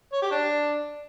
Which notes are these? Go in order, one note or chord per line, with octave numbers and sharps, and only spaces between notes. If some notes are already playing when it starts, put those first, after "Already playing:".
C#5
G4
D4